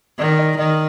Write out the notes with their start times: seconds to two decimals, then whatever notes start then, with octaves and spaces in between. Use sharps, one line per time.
0.19 D#3 D5
0.38 D#5
0.58 D#3 D#5